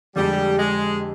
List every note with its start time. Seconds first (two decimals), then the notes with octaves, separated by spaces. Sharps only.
0.16 F2 D3 G3 G#3 D4 G4
0.59 G#3